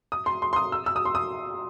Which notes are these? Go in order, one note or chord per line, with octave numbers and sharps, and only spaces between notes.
D#6
C6
C6
C6
D#6
E6
E6
D#6
C6
D#6